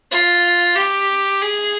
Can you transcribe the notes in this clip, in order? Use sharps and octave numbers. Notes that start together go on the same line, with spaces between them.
F4
G4
G#4